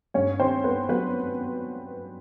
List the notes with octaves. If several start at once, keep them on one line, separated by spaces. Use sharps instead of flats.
G2 C#4 C#5
D#3 C4 C5
G2 B3 B4
F#3 B3 B4